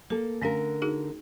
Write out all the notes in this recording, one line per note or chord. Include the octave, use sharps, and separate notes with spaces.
A#3 A4 A#4
D3 A3 C#4 A#4 F5
D#4 F#4 G#4